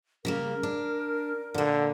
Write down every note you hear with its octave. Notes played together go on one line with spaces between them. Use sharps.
C#3 G3 A#3 A#4
D4
A#2 D3 A#3